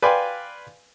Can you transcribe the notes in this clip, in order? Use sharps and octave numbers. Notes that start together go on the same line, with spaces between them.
B4 D5 F5 G5 G#5 C6